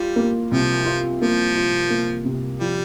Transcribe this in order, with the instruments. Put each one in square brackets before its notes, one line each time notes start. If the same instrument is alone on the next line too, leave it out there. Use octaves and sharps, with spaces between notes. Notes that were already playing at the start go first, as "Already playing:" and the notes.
Already playing: [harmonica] G3 [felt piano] F4
[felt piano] A#3
[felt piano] C2 [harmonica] F3
[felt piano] F4
[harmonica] F3 [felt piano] A#3
[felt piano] F4
A#3
C3
[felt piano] F3 [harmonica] G3